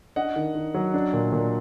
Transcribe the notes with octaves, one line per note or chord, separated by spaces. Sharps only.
D4 D#5 F#5
D#3
D#3
F#3
D4
A#2
A#2